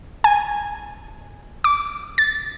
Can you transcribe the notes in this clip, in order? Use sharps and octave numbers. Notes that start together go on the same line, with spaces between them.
G#5
D6
A6